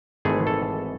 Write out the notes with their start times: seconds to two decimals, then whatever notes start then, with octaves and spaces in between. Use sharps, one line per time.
0.25 G#1 G#2 E3 A3 G#4
0.47 A4